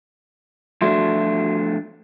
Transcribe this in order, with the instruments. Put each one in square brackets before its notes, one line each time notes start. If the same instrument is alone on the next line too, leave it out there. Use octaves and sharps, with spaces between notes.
[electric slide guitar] F3 A3 D4 [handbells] F#4 E5 C6